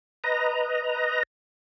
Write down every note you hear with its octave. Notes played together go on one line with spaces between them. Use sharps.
B4 D#5 A#5